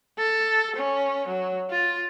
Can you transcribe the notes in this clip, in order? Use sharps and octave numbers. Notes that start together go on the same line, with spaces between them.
A4
C#4
F#3
F4